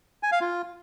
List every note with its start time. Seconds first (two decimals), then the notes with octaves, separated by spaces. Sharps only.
0.23 G#5
0.32 F5
0.41 F4